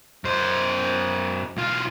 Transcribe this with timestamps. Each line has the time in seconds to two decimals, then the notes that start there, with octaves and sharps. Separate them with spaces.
0.24 F#2 C5
1.57 B1 F4